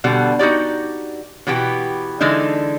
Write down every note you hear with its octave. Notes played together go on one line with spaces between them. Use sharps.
B2 D3 G3 F#5
D#4 F#4 G4 D5
B2 E3 B3 G4 G5
D3 E3 G#3 D4 D#4